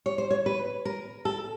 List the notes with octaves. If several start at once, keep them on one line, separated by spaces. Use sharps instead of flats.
C#5
C5
C#5
B4
A#4
A4